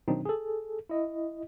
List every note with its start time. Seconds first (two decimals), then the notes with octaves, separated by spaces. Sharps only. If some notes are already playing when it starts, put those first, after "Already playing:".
0.08 B2 D#3 F#3 C4 D4 D#4
0.25 G#4 A4
0.89 E4 D#5